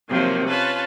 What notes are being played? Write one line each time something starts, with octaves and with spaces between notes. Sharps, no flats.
C3 D#3 F3 F#3 A#3
C#4 F4 B4 A5